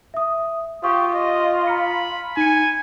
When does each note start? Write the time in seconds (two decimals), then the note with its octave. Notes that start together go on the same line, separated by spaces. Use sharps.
0.14 E5 D#6
0.84 F4 G4 C#6 D#6
1.14 D#5
1.67 A#5 B5 F6 C#7
2.37 D#4 G#5 C#7